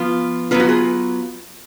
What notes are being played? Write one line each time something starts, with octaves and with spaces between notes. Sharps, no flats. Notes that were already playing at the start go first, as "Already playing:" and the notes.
Already playing: F3 B3 F4
F#3 B3 F4 B4
F#4
G#4